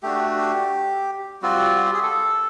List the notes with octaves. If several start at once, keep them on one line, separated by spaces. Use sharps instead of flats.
A3 D4 F#4 G4
G4
G3 C4 F4 F#4
F#4
G4
G#4
A4